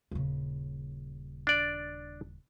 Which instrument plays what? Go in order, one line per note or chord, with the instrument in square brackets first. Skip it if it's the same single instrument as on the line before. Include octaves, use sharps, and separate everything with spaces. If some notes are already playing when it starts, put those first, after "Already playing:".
[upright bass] D#1 C#3
[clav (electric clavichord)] D4 D5